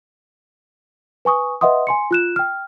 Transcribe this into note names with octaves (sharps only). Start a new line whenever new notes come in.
B4 G#5 C#6 D#6
B4 D#5 E5 F#5 C6 D#6
G#5 C6 C#7
F4 F#6 E7
G5 F6